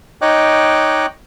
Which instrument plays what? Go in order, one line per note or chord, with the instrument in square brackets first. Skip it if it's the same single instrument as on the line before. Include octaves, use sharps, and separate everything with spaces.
[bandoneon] D#4 C#5 D#5 G5 D6 F#6